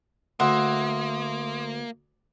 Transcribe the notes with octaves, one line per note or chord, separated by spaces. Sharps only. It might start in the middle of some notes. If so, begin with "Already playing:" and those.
D2 A#3 E5 F#5 C6 D#6